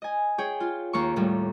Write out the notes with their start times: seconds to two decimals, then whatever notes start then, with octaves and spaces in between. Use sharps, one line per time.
0.02 D#5 G#5
0.38 G#4 C#5 G5
0.60 F4
0.93 D#2 A#3 A#4 C#6
1.16 D#2 A2 G3